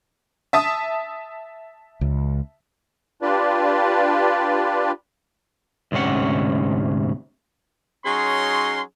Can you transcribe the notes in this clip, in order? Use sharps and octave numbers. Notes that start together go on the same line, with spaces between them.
E5 A5 D#6
C#2
D4 F4 G4 B4 D5
D2 G#2 C3 C#4 F#5
F#3 C#4 D#4 G#4 C6